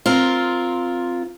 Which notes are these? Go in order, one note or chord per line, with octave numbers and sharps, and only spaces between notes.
C4 F4 A#4